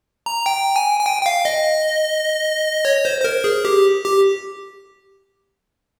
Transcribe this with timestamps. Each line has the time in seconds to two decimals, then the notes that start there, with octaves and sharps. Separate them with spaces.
0.26 A#5
0.46 G5
0.76 G#5
1.00 G#5
1.06 G5
1.22 G5
1.26 F5
1.45 D#5
2.85 C#5
3.05 C5
3.20 C5
3.24 A#4
3.44 G#4
3.65 G4
4.05 G4